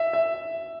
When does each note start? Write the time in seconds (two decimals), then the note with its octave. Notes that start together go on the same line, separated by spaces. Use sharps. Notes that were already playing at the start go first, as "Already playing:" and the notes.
Already playing: E5
0.13 E5